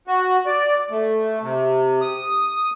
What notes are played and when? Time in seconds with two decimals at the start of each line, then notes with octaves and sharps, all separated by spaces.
0.07 F#4
0.46 D5
0.90 A3
1.42 C3
2.01 D#6